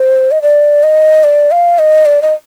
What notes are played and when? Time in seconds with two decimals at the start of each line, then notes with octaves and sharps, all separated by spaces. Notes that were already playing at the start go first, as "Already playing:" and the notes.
Already playing: C5
0.31 D#5
0.42 D5
0.83 D#5
1.24 D5
1.51 F5
1.79 D#5
2.06 D5
2.22 D#5